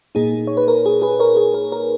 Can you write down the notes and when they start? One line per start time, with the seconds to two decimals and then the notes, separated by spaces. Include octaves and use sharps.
0.15 A#2 A#3 D#4 G#4
0.47 C#5
0.57 B4
0.68 A#4
0.86 G#4
1.02 G#4 B4
1.20 A#4 C#5
1.37 G#4
1.54 A#4
1.72 A#4